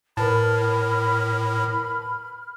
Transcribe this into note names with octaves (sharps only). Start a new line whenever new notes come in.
A2 A#4 B4 A5 B5 F6